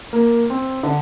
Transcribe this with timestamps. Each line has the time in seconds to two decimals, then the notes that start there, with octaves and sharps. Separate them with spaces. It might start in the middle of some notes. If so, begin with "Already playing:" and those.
0.13 A#3
0.50 C4
0.83 D3